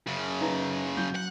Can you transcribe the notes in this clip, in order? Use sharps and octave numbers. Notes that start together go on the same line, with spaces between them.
F#2 C#3
D#4 B4 A#5
F#3 G6
F#5